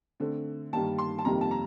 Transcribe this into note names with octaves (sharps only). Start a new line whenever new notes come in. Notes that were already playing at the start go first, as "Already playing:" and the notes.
D3 A3 C4
G2 D#3 G3 A#3 A5
C6
A5
F2 C3 D#3 G3 A#3 A#5
A5
A#5